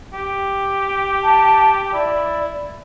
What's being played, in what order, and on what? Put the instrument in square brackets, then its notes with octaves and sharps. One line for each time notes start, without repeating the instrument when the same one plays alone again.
[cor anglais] G4
[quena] A5
[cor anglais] E4 [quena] D5